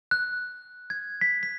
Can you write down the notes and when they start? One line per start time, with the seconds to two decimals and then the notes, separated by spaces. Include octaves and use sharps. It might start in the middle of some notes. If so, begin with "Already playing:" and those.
0.11 F#6
0.90 G#6
1.21 B6
1.43 B6